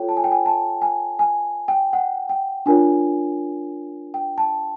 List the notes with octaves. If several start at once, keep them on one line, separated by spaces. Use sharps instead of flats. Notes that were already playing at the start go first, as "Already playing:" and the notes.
Already playing: F4 A4 C#5 G5
A5
G#5
G5
G#5
A5
G#5
G#5
G5
F#5
G5
D4 F4 A#4 C#5 G#5
G5
A5